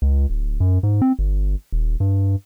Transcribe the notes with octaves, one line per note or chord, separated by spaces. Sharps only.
C#2
D1
F#2
G#2
C4
G1
D#1
G2